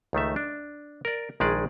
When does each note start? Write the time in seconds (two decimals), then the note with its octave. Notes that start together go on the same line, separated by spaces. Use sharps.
0.13 C#2 D#3 A3 E5
0.36 D4
1.05 A#4 D5
1.40 A#1 D#3 G#3 G#4 D5